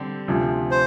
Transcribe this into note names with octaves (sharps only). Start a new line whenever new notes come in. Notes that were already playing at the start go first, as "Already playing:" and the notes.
Already playing: D3 G3 C4 G4
D2 C3 F3
C5